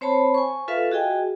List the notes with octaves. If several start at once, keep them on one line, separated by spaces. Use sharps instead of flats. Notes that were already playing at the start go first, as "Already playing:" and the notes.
C4 C5 C#5 A5 B5 C6
G#5 C#6
F4 A4 B4 E5 F5
F#4 G#4 D#5 G5 G#5